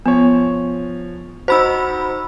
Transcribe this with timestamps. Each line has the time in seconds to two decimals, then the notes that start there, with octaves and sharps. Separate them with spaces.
0.06 F3 B3 C#5
1.48 D#4 F#4 C5 B5 E6